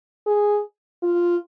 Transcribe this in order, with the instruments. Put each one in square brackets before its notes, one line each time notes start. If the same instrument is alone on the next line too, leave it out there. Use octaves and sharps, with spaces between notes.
[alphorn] G#4
F4